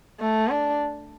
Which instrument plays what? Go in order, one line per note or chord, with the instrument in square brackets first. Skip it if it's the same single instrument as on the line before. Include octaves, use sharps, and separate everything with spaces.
[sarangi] A3
D4